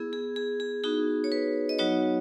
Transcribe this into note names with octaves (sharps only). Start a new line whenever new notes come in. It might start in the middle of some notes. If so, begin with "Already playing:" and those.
Already playing: B3 E4 G#4
G#4
G#4
G#4
B3 D#4 F#4 G#4
C#5
B4
D#5
F#3 B3 D#4 F#4 C#5